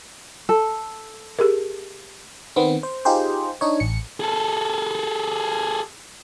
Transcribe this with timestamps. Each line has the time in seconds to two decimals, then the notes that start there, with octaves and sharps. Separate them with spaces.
0.49 A4
1.39 G4 G#4 A#4
2.56 D#3 B3 C4
2.83 C5
3.05 D#4 F4 G4 G#4 C5
3.61 D4 D#4 C#5
3.80 A1 C#7
4.20 G#4 A4